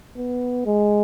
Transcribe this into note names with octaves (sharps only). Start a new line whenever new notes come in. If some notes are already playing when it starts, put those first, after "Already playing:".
B3
G#3